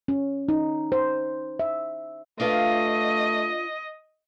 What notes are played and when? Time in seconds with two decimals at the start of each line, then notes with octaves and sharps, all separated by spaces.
0.08 C#4
0.49 D#4
0.92 C5
1.59 E5
2.40 A3 D4 F4 B4 D#5